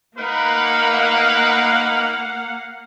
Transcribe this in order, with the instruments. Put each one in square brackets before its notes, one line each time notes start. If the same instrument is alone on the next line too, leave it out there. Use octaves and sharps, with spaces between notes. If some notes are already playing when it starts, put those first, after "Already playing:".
[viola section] A#3 F5 F#5 [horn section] D#4 A#4 B4